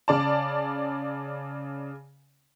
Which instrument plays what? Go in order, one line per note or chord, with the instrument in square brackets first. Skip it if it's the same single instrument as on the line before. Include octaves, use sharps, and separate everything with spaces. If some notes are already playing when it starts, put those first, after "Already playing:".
[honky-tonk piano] C#3 D5 A5